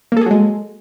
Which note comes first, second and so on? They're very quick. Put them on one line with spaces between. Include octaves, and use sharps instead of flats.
A#3 A4 G#4 F#3 G#3